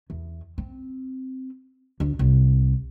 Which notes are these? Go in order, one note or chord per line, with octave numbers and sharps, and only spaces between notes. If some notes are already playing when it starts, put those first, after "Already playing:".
E2
C4
D2
C2